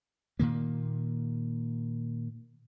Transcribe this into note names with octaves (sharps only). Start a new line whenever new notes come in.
A#2 D#3 A#3